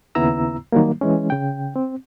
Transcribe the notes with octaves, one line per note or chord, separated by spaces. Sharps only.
D#2 C#3 B3 E4 A#5 E6
D#3 F#3 G3 A#3
E3 G#3 C#4
C#3 G5
C4